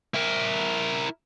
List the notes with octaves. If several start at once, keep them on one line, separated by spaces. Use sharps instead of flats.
E4 A#4